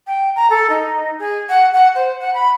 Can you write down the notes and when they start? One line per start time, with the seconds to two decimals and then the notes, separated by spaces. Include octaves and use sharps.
0.07 G5
0.35 A#5
0.50 A4
0.69 D#4
1.18 G#4
1.49 F#5
1.73 F#5
1.95 C5
2.20 F#5
2.34 B5